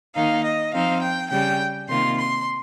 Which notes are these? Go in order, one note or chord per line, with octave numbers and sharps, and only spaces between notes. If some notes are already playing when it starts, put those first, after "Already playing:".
D#3 A#3 D#4 F5
D#5
F3 C4 D#4 F5
G5
C#3 G3 C#4 G5
C3 D#3 A#3 F4 C6
C6